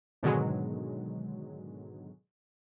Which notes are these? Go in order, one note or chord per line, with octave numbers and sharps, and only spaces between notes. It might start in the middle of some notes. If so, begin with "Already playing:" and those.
G#2 B2 D3 D#3 F#3 G#3